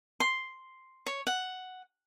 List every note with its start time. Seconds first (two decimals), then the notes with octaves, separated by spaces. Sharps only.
0.20 C6
1.06 C#5
1.27 F#5